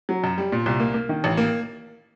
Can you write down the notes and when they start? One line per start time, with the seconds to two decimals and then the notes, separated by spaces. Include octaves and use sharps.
0.09 F#3
0.24 F#2
0.38 G3
0.52 A#2
0.66 C2
0.80 A#3
0.94 A#3
1.09 D#3
1.24 A1
1.37 A#3